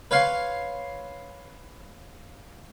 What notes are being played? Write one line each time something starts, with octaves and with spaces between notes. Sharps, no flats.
B4 C#5 F5 C6